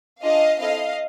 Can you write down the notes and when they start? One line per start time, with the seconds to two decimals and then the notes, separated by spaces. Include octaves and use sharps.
0.22 D4 F4 G#4 D#5 F5
0.58 C4 E4 A4 D#5 F5